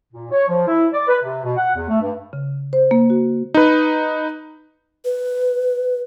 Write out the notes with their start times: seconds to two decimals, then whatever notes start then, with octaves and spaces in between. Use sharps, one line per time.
0.13 A#2
0.31 C#5
0.48 F3
0.68 E4
0.93 D5
1.08 B4
1.22 C3
1.44 B2
1.57 F#5
1.75 E2
1.88 A3
2.01 G2
2.33 C#3
2.73 C5
2.91 A#3
3.10 F#4
3.54 D#4 B4
5.05 B4